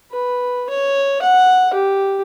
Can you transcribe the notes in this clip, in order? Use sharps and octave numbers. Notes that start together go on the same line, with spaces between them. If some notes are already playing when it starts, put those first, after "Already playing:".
B4
C#5
F#5
G4